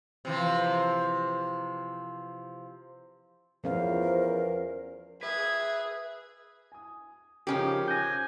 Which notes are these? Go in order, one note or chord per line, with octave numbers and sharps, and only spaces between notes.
C3 E3 F3
E2 F3 C#4 A#4 C5 F5
G#4 B4 E5 G#6
G#5 D#6
C#3 F3 C#4 D#4 G4 A#4
G#5 F#6 G6 A#6